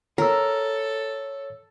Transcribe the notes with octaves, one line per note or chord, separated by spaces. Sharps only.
A4 A#4 C#5 E6